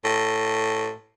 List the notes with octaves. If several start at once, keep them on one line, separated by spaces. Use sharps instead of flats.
A2